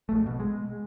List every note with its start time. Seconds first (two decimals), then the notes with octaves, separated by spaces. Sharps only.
0.09 A#1 A3
0.26 B2
0.40 G#3